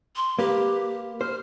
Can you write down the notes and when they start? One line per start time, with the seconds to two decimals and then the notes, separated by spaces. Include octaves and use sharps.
0.16 C6
0.39 A#3 G4 B4
1.21 C5 F6